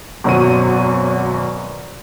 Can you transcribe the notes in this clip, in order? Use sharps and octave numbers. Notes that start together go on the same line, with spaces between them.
G#1 F#2 B2 F#3 F#5 D#7